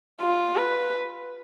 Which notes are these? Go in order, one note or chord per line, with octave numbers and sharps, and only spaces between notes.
F4
B4